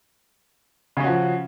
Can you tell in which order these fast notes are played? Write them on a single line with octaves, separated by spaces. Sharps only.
C#3 C#4 F#4 F3